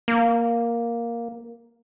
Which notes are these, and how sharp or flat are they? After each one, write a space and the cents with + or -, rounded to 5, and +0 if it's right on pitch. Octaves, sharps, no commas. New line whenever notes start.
A#3 +5